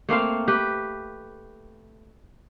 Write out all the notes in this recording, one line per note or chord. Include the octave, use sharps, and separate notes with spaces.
A3 A#3 C4 F5
G4 B4